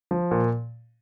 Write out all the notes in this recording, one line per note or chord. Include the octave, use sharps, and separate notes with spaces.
F3
A#2